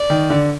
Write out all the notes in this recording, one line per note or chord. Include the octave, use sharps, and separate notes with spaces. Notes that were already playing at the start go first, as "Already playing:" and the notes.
Already playing: D5
D#3
D3